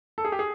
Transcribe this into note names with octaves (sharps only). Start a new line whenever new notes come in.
A4
G#4
G4
G#4